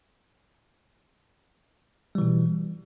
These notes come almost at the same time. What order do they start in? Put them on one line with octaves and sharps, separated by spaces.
G3 E3 B2